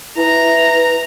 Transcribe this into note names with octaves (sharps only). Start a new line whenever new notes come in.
E4 B4 A#5